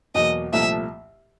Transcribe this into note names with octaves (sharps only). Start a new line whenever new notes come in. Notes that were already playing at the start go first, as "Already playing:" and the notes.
E2 B2 F#3 A#3 D#5
C2 A#2 F3 A3 E5